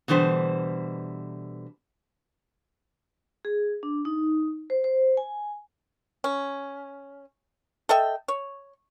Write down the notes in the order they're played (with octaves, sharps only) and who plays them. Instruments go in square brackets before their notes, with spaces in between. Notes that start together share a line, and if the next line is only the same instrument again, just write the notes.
[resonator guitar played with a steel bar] B2 D3 E3 G3 C5
[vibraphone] G#4
D4
D#4
C5
C5
G#5
[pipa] C#4
A4 D#5 E5 G5
C#5